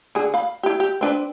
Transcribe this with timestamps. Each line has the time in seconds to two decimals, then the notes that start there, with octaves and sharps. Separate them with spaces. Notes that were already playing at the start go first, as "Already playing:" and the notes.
0.15 D3 G#4
0.34 F5 B5
0.63 E4 G4
0.80 G4
1.01 C4 D4 B4